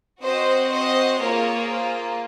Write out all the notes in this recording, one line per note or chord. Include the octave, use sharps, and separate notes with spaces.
C4 F#4 C5 D#5
C5 D#5
A#3 F4 G#4 A#4 C#5
C5